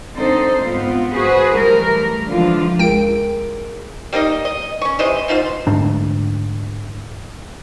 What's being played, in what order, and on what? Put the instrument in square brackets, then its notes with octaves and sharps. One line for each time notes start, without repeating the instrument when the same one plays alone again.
[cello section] D3 C4 D#4 A4 C5
G#2 B3 C4 F4
F#4 G#4 B4 C5
E3 G3 A3 A#4
D3 E3 F3 G#3 D4 F4
[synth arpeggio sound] C#2 G5 D7 [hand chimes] G#4 A#4
[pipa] G3 A#3 D#4 D#5
D#5
C#4 C#6
C3 E3 C5 D#5
B2 D#4 F4 C5
[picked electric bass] D2 G#2 D4